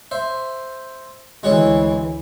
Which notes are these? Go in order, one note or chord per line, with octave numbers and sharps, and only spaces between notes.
C5 E5
D2 E3 G#3 F#4 C#5